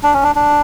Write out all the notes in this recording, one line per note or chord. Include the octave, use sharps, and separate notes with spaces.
D4
C#4
D4
D4